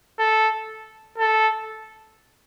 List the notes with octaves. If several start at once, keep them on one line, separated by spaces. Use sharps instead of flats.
A4
A4